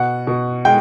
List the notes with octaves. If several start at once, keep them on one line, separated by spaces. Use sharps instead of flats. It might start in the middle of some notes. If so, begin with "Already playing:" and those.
Already playing: B2 F#5
B2
G#3 G5